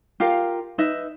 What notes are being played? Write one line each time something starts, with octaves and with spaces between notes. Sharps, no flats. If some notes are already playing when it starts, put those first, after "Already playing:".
F4 G4 A#4 F5
D#4 B4 D#5 E5